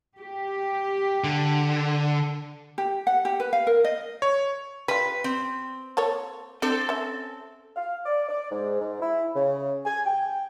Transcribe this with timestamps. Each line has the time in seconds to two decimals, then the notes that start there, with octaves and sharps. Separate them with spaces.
0.19 G4
1.24 D3
2.78 G4
3.07 F#5
3.25 G4
3.40 B4
3.53 F5
3.67 A#4
3.84 D#5
4.22 C#5
4.88 G3 F4 B4
5.24 C4
5.97 A#3 A4 C#5
6.62 C4 D4 A4
6.89 C#4 E5
7.76 F5
8.06 D5
8.29 D5
8.51 G#2
8.80 G#2
9.01 E4
9.35 C#3
9.85 G#5
10.06 G5